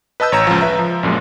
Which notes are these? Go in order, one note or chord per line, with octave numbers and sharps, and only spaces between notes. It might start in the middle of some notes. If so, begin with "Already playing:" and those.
B4 D#5 A5 E6 G6
A1 C#5 A#5 E7
C#2 F3
B4 E5 A#5
F3
A#1 F#2 A#2 G#3